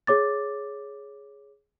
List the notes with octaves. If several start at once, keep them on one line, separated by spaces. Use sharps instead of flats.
G#4 C#5 D6 A6